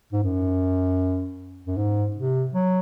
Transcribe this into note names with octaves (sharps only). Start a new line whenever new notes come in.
G#2
F#2
F#2
G#2
C3
F#3